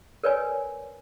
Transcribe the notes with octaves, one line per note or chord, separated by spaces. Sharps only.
A#4 B4 C#5 D5 G#5